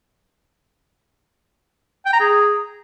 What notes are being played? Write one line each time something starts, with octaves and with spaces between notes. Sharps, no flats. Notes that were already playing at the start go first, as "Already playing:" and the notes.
G5
A#5
G#4